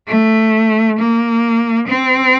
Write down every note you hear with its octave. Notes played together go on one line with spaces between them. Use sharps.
A3
A#3
C4